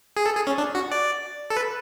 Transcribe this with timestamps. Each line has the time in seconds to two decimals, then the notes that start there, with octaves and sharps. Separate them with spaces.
0.17 G#4
0.26 A4
0.36 G#4
0.47 C#4
0.58 D4
0.75 F#4
0.92 D5
1.50 A4
1.56 B4